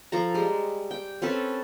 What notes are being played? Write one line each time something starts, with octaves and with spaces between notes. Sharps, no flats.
F3 A4 A#5
G3 G#3
G5
C4 C#4 A4 B4